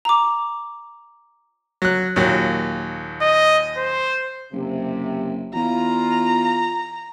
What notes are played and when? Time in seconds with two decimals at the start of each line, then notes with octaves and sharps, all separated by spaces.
0.05 A#5 D6
1.82 F#3 F#6
2.16 D#2 A#2 F#3
3.21 D#5
3.77 C5
4.52 F#1 C3
5.55 E2 F4 A#5